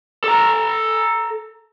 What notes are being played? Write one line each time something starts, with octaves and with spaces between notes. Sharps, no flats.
A4 A#5